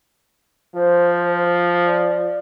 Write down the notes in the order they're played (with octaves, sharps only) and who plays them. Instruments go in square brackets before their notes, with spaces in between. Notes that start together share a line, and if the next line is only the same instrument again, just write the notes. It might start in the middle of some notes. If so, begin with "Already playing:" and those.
[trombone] F3 [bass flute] C5
[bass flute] D5